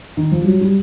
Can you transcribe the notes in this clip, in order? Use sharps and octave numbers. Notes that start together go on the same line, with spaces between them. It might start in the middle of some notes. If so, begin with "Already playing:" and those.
D#3
F3
G3
F#3
G3